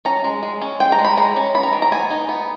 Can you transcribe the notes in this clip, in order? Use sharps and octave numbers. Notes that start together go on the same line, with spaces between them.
C#4 A#5
G#3
G#3
C#4
G#3 G5
A#5
G#3
B5
G#3 A#5
C#4
B3 B5
A#5
D#3
A#5
B3 G#5
D#4
B3